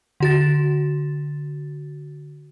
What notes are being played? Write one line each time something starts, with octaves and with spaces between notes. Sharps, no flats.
D3 F#4 A6